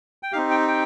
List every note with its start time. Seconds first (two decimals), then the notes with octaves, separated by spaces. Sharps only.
0.23 G5
0.32 C4 D#4 G4 F5
0.50 G5
0.68 G5